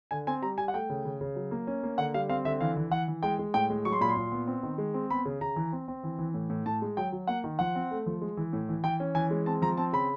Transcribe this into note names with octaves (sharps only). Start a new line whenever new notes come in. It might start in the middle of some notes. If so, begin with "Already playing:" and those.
D3 G#5
C4 G#5
G3 A#5
G3 G#5
F#5
A3 G5
C#3
C#3
C#3
F#3
A#3
C#4
A#3
D3 F#5
G3 F5
C4 F5
D3 E5
E3 F5
E3
E3 F#5
E3
G#3 G5
G#3
A2 G5
G#3
F#3 C#6
C6
A#2 B5
C6
A#2
B3
C4
D#3
G#3
C4
B3 B5
C#3
C#3 A#5
E3
C4
C4
E3
E3
A2
A2
A2 A5
G#3
F#3 G5
F#3
A#3 F#5
D#3
F3 F#5
C4
A3
F3
G#3
E3
A2
E3
E3 G5
C#4
E3 G#5
G#3
C4 A5
F3 A#5
C4 A5
C#3 B5